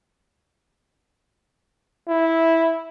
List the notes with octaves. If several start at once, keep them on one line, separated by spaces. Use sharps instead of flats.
E4